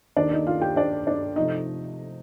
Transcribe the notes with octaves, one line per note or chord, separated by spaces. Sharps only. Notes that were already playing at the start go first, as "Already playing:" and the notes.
D#2 D#3 A#3 D4 D5
D#4 D#5
F4 F5
G4 G5
D4 D5
D4 D5
C3 F3 A3 D#4 D#5